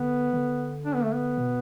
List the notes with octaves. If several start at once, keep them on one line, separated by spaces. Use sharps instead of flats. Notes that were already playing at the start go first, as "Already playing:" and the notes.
Already playing: D3 B3
D3
D4
B3
A3
B3
B2